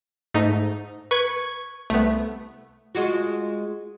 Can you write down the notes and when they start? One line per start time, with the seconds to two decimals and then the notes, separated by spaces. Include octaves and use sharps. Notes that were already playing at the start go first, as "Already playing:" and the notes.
0.34 G#2 A3 D#4
1.11 B4 C#6 G#6
1.90 C2 A3 B3
2.95 G#3 F4 F#4